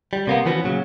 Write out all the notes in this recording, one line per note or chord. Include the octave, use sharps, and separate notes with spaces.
G3
C3 A#3 B3
E3 F3 B3 C#4 F#4
A#2 C#3 F#3